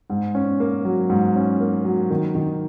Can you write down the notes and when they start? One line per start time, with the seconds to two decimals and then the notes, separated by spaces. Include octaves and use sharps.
0.10 G#2
0.35 C#4
0.60 A#3
0.85 F#3
1.10 G#2
1.35 C#4
1.60 A#3
1.85 F#3
2.10 D#3
2.35 D#3